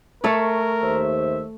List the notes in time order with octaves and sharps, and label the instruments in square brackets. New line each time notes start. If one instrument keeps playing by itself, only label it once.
[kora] A3 A4 C#5 [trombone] A#4
[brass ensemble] D#2 C5 E5